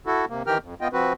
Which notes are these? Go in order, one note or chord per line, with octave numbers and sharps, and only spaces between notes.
E4 F#4 A4
C3 A#3
D#3 E3 G4 A#4 G5 F6
F2
B3 F4 D#5 G5
F3 C4 F#4 B4